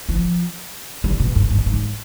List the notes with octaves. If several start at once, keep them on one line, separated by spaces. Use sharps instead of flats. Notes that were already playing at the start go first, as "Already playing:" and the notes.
F3
G3
B2
G2
G2
G#2